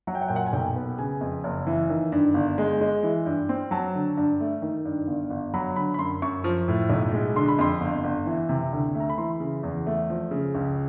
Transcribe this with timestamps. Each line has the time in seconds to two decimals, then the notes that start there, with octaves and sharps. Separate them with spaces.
0.07 F#3 F#5
0.15 G5
0.22 F#5
0.28 A#2 G5
0.36 F#5
0.46 G#5
0.53 B1 G5
0.76 B3
0.98 C#3 G#5
1.21 F2
1.44 F#1
1.67 E3
1.90 D#3
2.12 G2
2.34 G1
2.58 G#3
2.81 G#3
3.03 E3
3.26 G2
3.49 C4
3.71 F#3 A5
3.95 D3
4.17 G2
4.40 A3
4.62 D#3
4.85 G2
5.08 G1
5.30 G1
5.54 F#3 B5
5.76 D3 B5
5.94 B5
5.99 F#2 C6
6.22 F#2 C#6
6.44 F3
6.68 A2
6.90 B1
7.13 G#3
7.36 D3 C6
7.48 B5
7.59 F2 C6
7.81 G1
8.04 G1
8.26 E3
8.49 C3
8.73 D2
8.95 A3
9.00 A#5
9.10 B5
9.18 E3 C6
9.40 C#3
9.63 E2
9.86 A3
10.09 F3
10.31 C#3
10.55 C#2